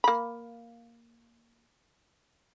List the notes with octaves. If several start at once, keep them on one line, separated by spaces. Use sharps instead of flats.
A#3 B5